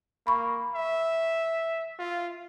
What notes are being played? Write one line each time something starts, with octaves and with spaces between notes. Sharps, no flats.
A#3 B5 C#6
E5
F4